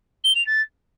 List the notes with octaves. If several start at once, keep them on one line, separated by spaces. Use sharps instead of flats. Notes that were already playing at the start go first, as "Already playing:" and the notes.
G7
F7
A6